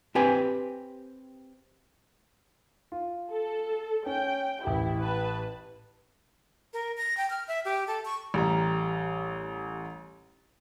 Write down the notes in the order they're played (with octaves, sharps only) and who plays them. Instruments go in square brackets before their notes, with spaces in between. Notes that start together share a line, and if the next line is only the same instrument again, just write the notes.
[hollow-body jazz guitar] C4 G4 B4 G#5
[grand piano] F4
[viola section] A4
[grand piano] C#4 [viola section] G5
[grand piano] A1 G4 [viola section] E4
[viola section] B4 A5
[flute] A#4
A#6
G5
F6
E5
G4
A4
C#6
[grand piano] A1 G3 A#5